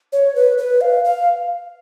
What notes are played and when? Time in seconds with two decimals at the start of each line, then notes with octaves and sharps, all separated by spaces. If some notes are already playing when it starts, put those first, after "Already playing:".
0.12 C#5
0.35 B4
0.58 B4
0.81 F5
1.05 F5